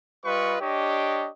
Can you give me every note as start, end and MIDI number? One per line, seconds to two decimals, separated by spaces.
0.25 0.56 55
0.25 0.56 65
0.25 0.56 71
0.25 0.56 75
0.25 0.56 85
0.60 1.29 62
0.60 1.29 67
0.60 1.29 73
0.60 1.29 75